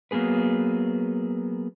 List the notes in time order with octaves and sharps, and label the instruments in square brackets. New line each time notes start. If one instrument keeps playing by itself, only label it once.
[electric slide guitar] F#3 A#3 B3 G#4 B4